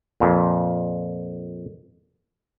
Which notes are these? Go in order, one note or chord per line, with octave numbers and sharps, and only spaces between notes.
F2 A#2